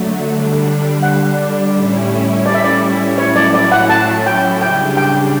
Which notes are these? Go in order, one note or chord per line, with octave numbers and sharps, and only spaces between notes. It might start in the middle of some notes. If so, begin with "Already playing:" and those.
Already playing: D3 F#3 A3
D3 G3 D4
F#5
A2 G3 C#4 E4
D5
E5
D5
A2 F#3 C#4 E4 C#5
D5
D5
F#5
A5
G5
C#3 G3 D4 G5
G5